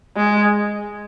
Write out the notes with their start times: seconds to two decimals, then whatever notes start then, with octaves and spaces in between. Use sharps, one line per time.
0.16 G#3